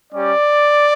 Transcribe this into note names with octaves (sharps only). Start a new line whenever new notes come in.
G3 C#4 G4 D5